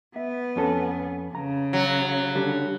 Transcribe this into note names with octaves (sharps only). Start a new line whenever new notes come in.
B3 E5
F2 C#4 A4
C#3 A#5
F#3
D3 G3